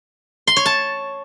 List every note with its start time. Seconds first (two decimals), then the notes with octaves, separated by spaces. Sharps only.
0.47 C6
0.57 C#5
0.66 A5